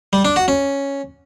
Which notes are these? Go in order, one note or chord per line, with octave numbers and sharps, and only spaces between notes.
G3
D4
F#4
C#4